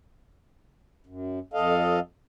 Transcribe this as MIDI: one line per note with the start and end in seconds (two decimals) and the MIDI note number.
1.06 1.39 42
1.53 1.99 41
1.53 1.99 69
1.53 1.99 75
1.53 1.99 77